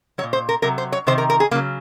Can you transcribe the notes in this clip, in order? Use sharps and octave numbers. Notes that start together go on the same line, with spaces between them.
F#3 C#5
A#2
C5
A#4
C3 F#3 A#4
C5
C#5
C3 D#3 C5
A#4
A#4
G#4
C#3 F#3 A#3